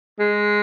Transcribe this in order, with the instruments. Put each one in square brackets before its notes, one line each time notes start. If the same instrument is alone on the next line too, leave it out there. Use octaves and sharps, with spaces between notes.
[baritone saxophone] G#3